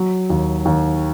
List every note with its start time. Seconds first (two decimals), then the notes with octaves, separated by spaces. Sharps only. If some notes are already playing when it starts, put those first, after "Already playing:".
Already playing: F#3
0.30 D#2
0.65 D#2